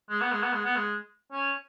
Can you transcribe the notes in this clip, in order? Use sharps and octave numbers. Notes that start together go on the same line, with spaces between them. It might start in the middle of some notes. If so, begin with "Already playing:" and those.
G#3
B3
G#3
B3
G#3
B3
G#3
C#4